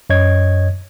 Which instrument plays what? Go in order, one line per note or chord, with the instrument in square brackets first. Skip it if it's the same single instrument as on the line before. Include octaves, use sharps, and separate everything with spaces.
[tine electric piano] F#2 C#5 D#5 G#6